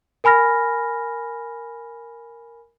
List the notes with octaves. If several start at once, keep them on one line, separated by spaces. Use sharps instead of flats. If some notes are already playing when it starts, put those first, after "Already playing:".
A#4 G#5 B5 F6 A#6